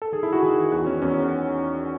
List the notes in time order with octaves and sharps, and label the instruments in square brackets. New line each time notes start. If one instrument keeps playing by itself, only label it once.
[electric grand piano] A4
D#3 G#4
E4
F#4
D#3 G#4
E2 F#4
C#4
E2 C#4